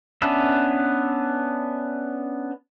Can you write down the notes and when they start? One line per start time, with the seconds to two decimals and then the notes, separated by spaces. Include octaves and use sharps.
0.22 B3 C#4 D4 B4 E5